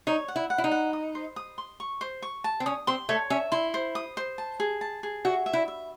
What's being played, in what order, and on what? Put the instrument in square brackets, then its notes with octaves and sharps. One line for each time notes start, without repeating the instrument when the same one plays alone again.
[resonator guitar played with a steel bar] D#4 [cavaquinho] C#5
[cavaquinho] F#5
[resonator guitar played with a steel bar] E4
[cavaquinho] F#5
[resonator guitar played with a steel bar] E4
D#4
[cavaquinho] F#5
D#6
C5
D#6
C6
C#6
C5
C#6
A5
[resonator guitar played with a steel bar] C4
[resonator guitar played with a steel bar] C#4 [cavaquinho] D#6
[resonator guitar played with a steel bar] C4 [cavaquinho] C6
[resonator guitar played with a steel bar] A3 [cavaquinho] C#5
[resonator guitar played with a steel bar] C#4 [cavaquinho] E5
[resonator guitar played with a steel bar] E4 [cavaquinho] C6
[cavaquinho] C5
D#6
C5
A5
G#4
A5
G#4
[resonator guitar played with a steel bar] F#4 [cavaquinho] E5
[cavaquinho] E5
[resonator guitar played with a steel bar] E4
[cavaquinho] E5